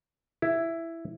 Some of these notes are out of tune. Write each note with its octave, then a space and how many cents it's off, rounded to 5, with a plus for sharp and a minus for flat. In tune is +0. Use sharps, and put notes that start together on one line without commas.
E4 +5